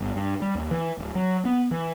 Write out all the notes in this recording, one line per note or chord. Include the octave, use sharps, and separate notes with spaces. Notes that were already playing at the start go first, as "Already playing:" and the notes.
G1
G2
G3
D#2
E3
D1
F#3
B3
E3